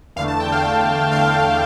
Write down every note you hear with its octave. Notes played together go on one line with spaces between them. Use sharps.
E2 D3 A3 F5
A5
G5
F5
E2 D3 A3
E2 D3 A3 F5